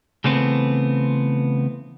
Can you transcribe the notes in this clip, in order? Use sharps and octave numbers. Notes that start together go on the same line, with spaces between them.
C#3 E3 A3 B3 C4